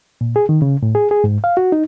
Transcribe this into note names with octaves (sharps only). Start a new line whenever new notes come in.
A#2
G#4
D#3
C#3
A2
G#4
G#4
G#2
F5
F#4
D#4